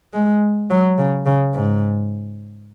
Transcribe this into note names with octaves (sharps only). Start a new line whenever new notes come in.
G#3
F#3
C#3
C#3
G#2